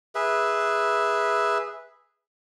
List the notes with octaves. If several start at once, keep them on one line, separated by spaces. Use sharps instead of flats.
G#4 B4 E5